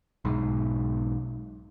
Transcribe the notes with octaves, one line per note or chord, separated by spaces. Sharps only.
B1 G#2